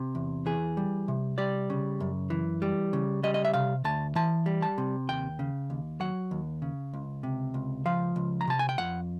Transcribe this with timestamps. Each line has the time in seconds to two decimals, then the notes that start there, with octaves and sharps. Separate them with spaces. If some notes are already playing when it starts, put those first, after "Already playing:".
Already playing: C3
0.15 E2
0.46 E3 G#4
0.77 G3
1.08 C3
1.38 G3 D5
1.70 C#3
2.00 F#2
2.30 E3
2.62 G3
2.93 C#3
3.23 G3 D#5
3.34 D#5
3.45 E5
3.54 C3 F5
3.84 D2 A5
4.15 E3 A5
4.46 G3
4.62 A5
4.78 C3
5.09 D#2 G5
5.39 C#3
5.70 D#2
6.00 F#3 F#5
6.31 D#2
6.62 C#3
6.94 C#2
7.23 C3
7.54 C#2
7.86 F3 F5
8.16 C#2
8.41 A#5
8.47 C3 A5
8.59 G#5
8.69 G5
8.78 F2 F#5